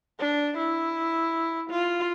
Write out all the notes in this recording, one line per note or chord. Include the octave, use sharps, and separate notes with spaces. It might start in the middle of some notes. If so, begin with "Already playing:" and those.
D4
E4
F4